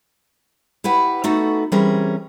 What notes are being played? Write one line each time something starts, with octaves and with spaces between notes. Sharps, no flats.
E4 G4 B4 F#5
A3 B3 D#4 F#4 A4
E3 G3 C4 C#4 G#4 A#4